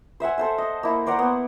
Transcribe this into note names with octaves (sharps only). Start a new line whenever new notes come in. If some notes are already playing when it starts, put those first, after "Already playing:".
C5 E5 F#5 G#5
A4 C5 E5
D#5
A#3 E4
C5 D5 F#5 A#5
B3